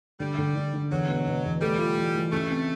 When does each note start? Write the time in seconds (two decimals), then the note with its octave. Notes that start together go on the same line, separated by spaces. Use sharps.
0.20 D3 G3
0.38 D3
0.56 D3
0.73 D3
0.91 E2 F#3
1.08 B2
1.27 B2
1.44 E2
1.61 G3 A3
1.79 F4
1.97 E3
2.15 E3
2.32 C#3 A3
2.50 C4